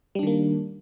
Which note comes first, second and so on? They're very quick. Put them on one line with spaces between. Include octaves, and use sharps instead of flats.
G3 D4 D#3 A#3